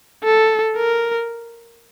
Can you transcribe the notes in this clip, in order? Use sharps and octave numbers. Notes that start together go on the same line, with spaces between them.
A4
A#4